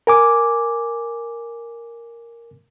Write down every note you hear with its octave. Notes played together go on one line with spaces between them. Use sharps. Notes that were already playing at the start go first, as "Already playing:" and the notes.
A#4 G#5 D6